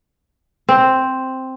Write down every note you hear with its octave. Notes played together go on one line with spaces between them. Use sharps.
C4